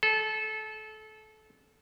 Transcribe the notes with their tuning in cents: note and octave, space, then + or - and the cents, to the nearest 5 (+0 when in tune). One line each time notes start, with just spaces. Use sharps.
A4 -25